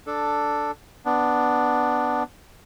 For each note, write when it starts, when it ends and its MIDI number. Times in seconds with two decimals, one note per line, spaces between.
0.06 0.71 62
0.06 0.71 69
1.05 2.23 59
1.05 2.23 62